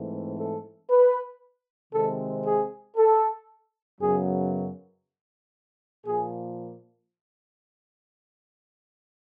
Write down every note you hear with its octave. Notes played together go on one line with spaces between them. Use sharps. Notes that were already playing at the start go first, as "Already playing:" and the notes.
Already playing: G#2 E3 A3 C4
A4
B4
C3 D#3 G#3 C4 A4
G#4
A4
F#2 C#3 F#3 B3 G#4
A#2 F3 A#3 G#4